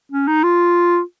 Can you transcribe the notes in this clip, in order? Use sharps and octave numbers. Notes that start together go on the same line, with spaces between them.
C#4
D#4
F4